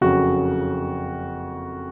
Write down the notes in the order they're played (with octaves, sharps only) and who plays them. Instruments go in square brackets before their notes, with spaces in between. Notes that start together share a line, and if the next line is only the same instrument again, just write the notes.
[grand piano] F#1 F2 C#3 F#4